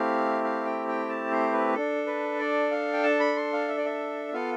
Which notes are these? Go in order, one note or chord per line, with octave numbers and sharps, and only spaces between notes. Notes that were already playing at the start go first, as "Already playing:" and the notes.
Already playing: A3 C4 E4 G4 F5
F5
G5
G5
A5
C5
B4
D4 A4
B4
D5
F5
G5
A5
B5
C6
F5
E5
D5
E5
B3 F4 A4 F5